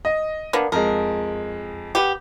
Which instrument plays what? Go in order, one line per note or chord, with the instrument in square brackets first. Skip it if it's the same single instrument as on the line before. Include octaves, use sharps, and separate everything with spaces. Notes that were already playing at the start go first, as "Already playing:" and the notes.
[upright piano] D#5
[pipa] A#3 B3 D4
[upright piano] F2 G#3 [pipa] A#4
[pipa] B3 G4